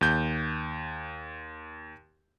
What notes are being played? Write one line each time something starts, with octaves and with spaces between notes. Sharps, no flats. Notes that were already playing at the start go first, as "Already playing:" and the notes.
D#2 G6